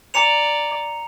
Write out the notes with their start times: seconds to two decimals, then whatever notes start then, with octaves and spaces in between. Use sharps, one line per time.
0.14 D5 A#5 C#7 F7